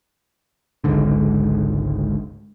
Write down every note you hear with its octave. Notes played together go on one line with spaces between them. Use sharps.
G#1 C#2 G#2 D3